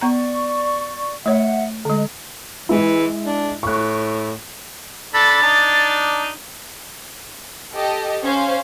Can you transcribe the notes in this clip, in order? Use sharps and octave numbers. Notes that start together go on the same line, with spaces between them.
B3 D5 A#5 C#6
A3 C#5 E5 F#5
D3 G#3 D#5
E3 G#3 E4
D4
A2 C#6 F#6
D4 A4 B5 A6
D4 D#4
G4 A4 D#5
C#4 C5 F5